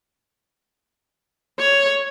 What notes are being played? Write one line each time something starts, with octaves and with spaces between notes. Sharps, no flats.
C#5